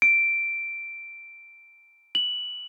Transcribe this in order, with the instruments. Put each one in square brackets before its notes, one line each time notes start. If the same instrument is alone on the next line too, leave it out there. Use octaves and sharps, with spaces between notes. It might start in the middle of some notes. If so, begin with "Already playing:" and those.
[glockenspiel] D7
F#7